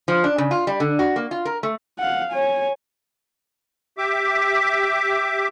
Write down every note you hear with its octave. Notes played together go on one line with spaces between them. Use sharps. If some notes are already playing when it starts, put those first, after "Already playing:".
F3
D4
C#3
F4
G3
D3
F#4
A#3
F4
A#4
A3
F5 F#5
C#5 G#5
G4 E5 D6